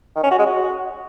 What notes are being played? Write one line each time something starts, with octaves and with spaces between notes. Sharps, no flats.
D#3
C#4
F#4
G#3
F#4